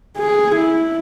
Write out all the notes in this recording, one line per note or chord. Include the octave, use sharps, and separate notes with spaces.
G#4
E4